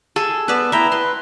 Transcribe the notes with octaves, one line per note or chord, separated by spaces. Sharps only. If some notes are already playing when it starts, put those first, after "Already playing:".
G#4 A4
B3 B4 D5 E5
E4 E5 G5 A#5
B4 C6